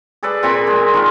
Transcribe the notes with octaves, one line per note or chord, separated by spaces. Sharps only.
G#4 A4 B4 D5
A#2 C4 G#5 B5
G#3
D#3 F4